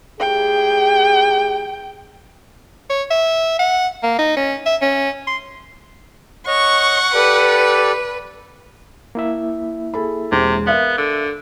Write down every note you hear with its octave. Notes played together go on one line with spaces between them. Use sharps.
A2 G4 G#4 G5
C#5
E5
F#5
A#3
D#4
C#4
E5
C#4
C6
C#5 D#5 F#5 C#6
G4 A4 B4 D5
A#3 E4 E5
G#4 A4 B5
E1 C3 G#3 C5
B3 A#4 E5 F5
D3